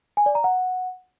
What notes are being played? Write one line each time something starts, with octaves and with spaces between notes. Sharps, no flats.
G#5
D5
A#5
F#5